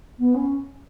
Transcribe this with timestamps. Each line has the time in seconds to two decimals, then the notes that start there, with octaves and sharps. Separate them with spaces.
0.19 B3
0.34 C#4